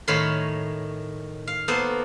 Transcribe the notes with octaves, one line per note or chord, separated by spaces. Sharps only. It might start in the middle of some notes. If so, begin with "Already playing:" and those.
A2 D#3 C#5 F5 B5 C6
F5
A#3 B3 A4 C5